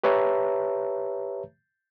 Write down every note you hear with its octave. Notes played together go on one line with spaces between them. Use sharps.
G4 B4 C#5 E5 A5 A#5